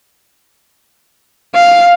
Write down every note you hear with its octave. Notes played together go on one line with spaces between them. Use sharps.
F5